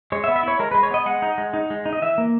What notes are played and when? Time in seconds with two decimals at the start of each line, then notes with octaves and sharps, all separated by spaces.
0.12 G#3 C#5
0.24 E5
0.28 B3
0.36 E5
0.43 E4 C#5
0.59 G#3 A#4
0.71 G#3 B4
0.83 C#5
0.91 B3 D#5
1.06 G#3 F#5
1.22 D#4
1.38 G#3
1.54 D#4
1.70 G#3
1.86 D#4
1.93 D#5
2.02 E3 E5
2.18 A#3